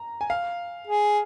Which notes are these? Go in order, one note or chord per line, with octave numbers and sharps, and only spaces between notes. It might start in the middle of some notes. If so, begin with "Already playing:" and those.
Already playing: A#5
G#5
F5
G#4